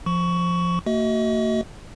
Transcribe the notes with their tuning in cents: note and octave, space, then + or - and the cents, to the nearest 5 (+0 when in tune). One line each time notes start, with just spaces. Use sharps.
F3 +0 C#6 +15
A#3 -45 F#4 +25 D#5 +35